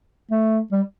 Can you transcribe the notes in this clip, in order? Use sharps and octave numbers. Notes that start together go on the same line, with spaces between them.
A3
G3